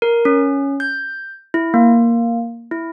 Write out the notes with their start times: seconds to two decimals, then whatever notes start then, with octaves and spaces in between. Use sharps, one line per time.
0.02 A#4
0.25 C#4
0.80 G6
1.54 E4
1.74 A#3
2.71 E4